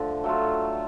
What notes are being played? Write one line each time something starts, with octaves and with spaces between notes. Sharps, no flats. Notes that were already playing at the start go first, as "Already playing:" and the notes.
Already playing: D3 F3 A3
F#3 A3 F4